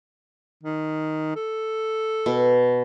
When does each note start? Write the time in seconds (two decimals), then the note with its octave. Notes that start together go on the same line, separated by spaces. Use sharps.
0.63 D#3
1.36 A4
2.26 B2